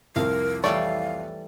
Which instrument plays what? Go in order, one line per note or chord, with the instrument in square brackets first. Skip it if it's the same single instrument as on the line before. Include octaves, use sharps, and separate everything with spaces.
[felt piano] C2 F2 F3 [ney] A#4 [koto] F5
[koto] E3 G3 A3 [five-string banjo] C#5 D5 [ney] F5